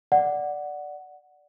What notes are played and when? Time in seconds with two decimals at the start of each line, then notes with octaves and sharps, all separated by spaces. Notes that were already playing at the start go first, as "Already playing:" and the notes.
0.12 D5 F#5